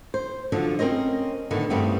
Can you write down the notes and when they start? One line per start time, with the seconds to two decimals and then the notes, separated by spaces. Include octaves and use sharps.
0.14 C5
0.52 D3 F3 F#3 D4
0.79 C4 C#4 A#4 C5 D#5
1.51 A2 D3 D#3 B3
1.70 G2 C#3 G3 A3 B3 C4